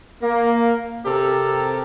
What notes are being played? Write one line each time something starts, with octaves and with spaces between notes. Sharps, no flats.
A#3
C3 C4 G4 A4 A#4